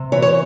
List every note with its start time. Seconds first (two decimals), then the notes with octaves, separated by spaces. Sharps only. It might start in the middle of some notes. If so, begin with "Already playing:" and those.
Already playing: C3
0.12 E3 C#5
0.22 C#5